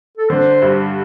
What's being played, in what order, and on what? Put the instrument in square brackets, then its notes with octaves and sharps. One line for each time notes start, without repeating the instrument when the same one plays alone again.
[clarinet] A4
[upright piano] D3 [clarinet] C5
[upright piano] G2